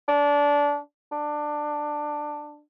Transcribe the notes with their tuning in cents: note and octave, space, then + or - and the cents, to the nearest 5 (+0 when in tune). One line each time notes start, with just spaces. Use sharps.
D4 -20
D4 +15